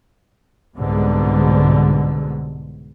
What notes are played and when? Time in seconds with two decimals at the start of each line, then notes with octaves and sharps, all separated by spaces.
0.77 C2 G#2 B2 D3